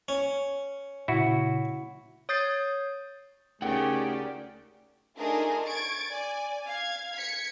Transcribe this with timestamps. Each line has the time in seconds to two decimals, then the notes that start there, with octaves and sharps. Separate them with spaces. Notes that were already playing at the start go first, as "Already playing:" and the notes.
0.08 C#4
1.08 A#2 C#3 E4 F#4
2.29 C#5 D#6 G6 A6 C7
3.62 D2 C#3 D#4 G4 A#4 D5 F#5 G5
5.19 A3 D4 D#4 F4 G#4 A#4
5.65 C#6 G#6 A6 D7
6.10 D5 G#5
6.67 F5 G#6
7.14 G#6 B6 C#7